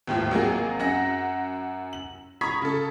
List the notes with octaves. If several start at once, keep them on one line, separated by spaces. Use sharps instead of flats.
G1 D#2 A2 F3
G#1 F#3 A#3 G#4
F#2 F#5 A#6
F#7
A#5 B5 C#6 D#6 G#6 B6
C#3 A4